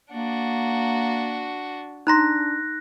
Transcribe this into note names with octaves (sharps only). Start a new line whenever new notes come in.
A#3 D4 F#4
D4 D#4 A#5 C6 F#6 A#6